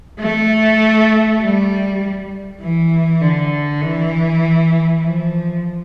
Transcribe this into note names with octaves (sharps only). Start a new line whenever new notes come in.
A3
G3
E3
D3
E3
F3